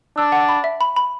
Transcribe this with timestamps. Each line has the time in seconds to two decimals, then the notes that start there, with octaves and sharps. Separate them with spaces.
0.17 D4 E6
0.32 F#5
0.49 B5
0.64 E5
0.81 B5
0.96 B5